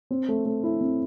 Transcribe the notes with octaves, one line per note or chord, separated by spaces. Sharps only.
C4
A3
A3
E4
C4